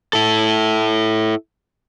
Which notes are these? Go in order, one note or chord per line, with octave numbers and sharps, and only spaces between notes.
E4 A4